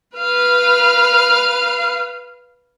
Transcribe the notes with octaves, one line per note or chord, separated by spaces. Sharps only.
B4 F5